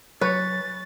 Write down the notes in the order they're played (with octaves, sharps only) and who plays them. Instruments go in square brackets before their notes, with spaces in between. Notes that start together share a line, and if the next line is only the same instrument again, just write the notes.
[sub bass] F#3 [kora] B4 [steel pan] C#5 [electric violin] A6